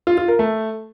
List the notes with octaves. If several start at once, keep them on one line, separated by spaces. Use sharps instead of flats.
F4
F4
A#4
A3